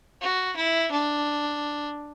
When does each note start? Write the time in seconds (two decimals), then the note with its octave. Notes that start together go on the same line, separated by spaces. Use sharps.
0.21 F#4
0.56 E4
0.91 D4